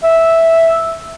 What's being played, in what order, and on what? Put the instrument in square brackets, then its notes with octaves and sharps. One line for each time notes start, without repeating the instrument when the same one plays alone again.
[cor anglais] E5